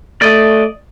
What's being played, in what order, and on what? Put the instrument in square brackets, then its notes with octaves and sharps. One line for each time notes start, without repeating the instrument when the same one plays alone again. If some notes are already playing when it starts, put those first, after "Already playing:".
[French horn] A3 [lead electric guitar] D5 D#5